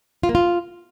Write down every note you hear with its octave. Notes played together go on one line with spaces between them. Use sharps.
F4
A#3
F4